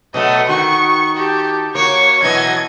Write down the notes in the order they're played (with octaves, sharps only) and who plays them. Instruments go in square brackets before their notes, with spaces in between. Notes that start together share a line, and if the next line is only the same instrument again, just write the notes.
[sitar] B2 F#3 A3 [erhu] D#5
[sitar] D#3 F#4 [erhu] C#6
[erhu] G4 [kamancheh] A5
[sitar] A#3 F#4 [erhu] C#5 [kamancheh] C#6
[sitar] B2 E3 F#3 [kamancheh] D#5 [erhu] G#6